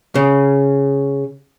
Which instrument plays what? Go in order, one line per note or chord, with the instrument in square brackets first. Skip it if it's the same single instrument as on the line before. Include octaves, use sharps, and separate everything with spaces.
[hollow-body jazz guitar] C#3